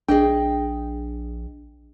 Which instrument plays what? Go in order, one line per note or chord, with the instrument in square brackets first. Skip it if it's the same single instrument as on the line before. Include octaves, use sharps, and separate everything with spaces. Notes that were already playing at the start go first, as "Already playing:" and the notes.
[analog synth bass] A#1 [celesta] D4 [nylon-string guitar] G#4 D#5 G5